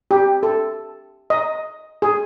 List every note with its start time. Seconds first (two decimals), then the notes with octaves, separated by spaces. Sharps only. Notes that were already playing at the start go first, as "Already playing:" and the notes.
0.11 G4
0.43 A4
1.30 D#5
2.02 G#4